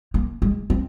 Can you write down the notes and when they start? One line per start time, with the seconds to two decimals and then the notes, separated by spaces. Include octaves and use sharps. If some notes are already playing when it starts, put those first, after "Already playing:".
0.14 A#3
0.42 G#3
0.70 C4